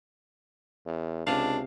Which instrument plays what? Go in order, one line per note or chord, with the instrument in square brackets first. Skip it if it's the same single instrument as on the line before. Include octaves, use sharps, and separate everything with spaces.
[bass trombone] E2
[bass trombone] C#2 [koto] C3 F5 [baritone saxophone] D4